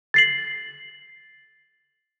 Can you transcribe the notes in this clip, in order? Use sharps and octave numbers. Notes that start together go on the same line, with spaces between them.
A6 C7 F#7